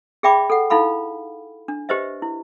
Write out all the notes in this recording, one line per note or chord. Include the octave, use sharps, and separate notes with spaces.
G#4 D5 E5 G5 B5 D6
A4 F#5
D#4 E4 A4 F5 B5
D4
G4 B4 C5 D#5 E5
E4